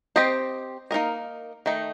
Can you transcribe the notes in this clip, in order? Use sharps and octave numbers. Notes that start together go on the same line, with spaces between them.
C4 G4 C5 D#5
A#3 D#4 A#4 D#5
D#3 A3 D#4